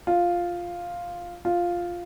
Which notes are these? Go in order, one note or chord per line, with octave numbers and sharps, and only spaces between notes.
F4
F4